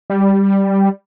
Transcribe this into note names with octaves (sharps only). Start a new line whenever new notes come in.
G3